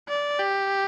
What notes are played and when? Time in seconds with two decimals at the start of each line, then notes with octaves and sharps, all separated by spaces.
0.09 D5
0.39 G4